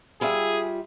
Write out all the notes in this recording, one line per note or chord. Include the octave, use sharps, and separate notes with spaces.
G3 F4 G#4 E5